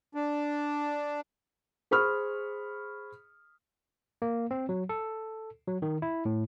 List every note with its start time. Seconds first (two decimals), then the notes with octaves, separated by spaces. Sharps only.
0.15 D4
1.91 G#4 C5 B5 C#6 D#6 F6
4.22 A#3
4.51 C4
4.69 F#3
4.89 A4
5.68 F#3
5.82 D#3
6.02 E4
6.25 A2